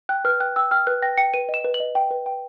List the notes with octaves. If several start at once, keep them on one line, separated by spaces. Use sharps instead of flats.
G5 F#6
B4 F6
G5 F#6
G5 E6
G5 F6
B4 F#6
G5 A#6
G5 C#7
B4 D#7
D#5
E7
B4
F#7
D#5
G5
B4
G5